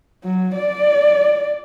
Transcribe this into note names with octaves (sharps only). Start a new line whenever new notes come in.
F#3
D5